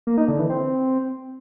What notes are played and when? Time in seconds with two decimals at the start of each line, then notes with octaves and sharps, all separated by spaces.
0.07 A#3
0.18 D#4
0.28 D3
0.39 E3
0.50 C4